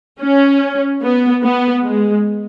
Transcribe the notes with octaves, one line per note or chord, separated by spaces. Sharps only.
C#4
B3
B3
G#3